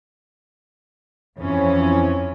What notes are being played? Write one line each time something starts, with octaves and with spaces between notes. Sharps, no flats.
F2 E3 C#4